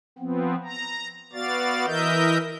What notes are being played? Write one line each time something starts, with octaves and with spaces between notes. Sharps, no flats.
F3 B3 C4
A#5
B3 F#4 D5 F5 A6
E3 A#4 D#5 E5 G6